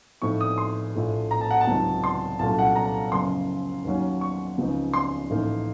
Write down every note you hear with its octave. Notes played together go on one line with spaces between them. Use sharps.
A2 F3 C4 D#4 C#6
D#6
C6
A#1 A2 A3
A#5
A5
F#5
A5
C#2 C3 D#3 F#3
C6
C2 A#2 F#3 A3 C#4 A5
F#5
A#5
F#1 F#2 C#3 F3 C6
D#2 D#3 F#3 A#3 C#4
C#6
C#2 C#3 F3 C4 D#4
C6
A1 A2 F3 A#3 D#4